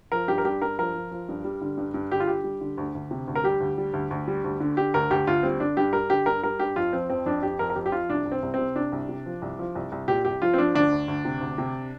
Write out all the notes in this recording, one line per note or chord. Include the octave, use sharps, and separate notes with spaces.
F3 A#4
G2 G4
A#4
G2 G4
G2 A#4
F3 A#4
F3
F3
G2
G3
D3
G2
G2
D3 G4
F4
G3 G4
G3
D3
D2
D2
C3
D2
A#4
G3 G4
D2
G3
D2
D2
G3
D2
D3
D3 G4
D2 A#4
D2 G4
D2 F4
G3 C4
D3 D4
G2 G4
G3 A#4
D3 G4
G2 A#4
G3 A#4
G2 G4
F2 F4
F3 C4
F2 C4
F2 D4
F2 G4
F2 A#4
A#4
F2 G4
G4
F3 F4
C2 D4
C2
C4
C2
C3 C4
C3 D4
C2
C3
F3
C2
F3
C2
C2
A#2 G4
C2 G4
F3 F4
C4
F3 D4
D2 D4
D2
D2
C3
D2
C3